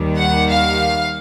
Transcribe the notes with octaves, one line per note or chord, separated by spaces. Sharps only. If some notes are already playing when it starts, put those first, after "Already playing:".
Already playing: D#2 D#3 G3
F#5
F5